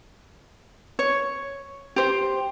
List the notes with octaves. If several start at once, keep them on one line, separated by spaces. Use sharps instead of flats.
C#5
G4 C5